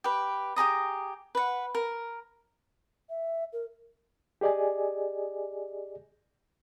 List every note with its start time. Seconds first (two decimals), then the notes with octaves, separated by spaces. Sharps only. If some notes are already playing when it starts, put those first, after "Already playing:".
0.04 G4 B4
0.56 G4 G#4 A#5 D#6
1.35 B4 F#5
1.75 A#4
3.09 E5
3.53 A#4
4.41 G4 G#4 D5 D#5 G#5